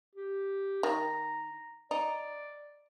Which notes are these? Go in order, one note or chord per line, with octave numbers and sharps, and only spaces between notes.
G4
D#3 A#5
D#4 D5